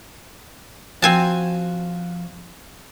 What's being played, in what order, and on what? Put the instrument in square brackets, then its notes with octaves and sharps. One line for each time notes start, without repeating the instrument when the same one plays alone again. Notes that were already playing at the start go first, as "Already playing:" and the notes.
[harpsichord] F3 F#4 [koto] C4 G#5 A5